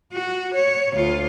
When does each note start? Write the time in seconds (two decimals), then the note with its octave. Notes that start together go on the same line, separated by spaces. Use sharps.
0.13 F#4
0.54 C#5
0.94 D2 F4